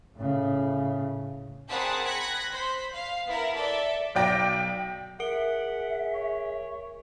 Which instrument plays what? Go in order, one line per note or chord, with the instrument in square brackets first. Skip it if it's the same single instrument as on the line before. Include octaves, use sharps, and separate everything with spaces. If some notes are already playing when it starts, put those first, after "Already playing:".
[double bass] A2 C#3
[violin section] C4 G#4 A#4 F#5 A5 B5
B5 F#6 G#6 A#6 C#7
C5 B5
F5
B3 E4 A#4
A4 D5 E5
[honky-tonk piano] B1 D5 G5 A#6
[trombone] G#4 [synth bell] A#4 D7 G7 [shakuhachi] E5 [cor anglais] F#5
[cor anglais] C#5